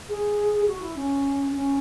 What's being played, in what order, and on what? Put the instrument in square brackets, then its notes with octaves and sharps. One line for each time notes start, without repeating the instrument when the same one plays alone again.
[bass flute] G#4
F#4
E4
C#4
C#4